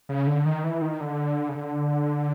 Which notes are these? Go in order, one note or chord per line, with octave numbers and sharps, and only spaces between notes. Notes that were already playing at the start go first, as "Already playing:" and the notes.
C#3
D3
D#3
E3
D#3
D3
C#3
D3